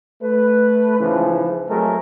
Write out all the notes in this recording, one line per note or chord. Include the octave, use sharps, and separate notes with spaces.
A3 B4
G#2 C#3 E3 F3
F#3 G#3 A3 C4 G#4 A#4